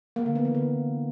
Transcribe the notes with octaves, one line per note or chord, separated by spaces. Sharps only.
A#3
D3
B3
E3
D3